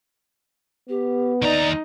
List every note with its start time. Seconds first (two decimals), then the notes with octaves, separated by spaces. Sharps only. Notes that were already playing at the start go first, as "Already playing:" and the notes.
0.89 B3 G4
1.42 D#2 D#4 D5 D#5 A#5